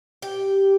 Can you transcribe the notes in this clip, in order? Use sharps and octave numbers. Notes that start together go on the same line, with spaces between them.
G4